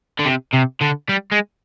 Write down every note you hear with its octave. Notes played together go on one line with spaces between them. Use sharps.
D3
C3
C3
D3
G3
G#3